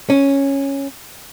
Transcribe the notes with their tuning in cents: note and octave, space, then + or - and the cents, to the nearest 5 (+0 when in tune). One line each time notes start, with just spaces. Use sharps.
C#4 -5